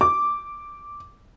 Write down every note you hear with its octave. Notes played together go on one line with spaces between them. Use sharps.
D6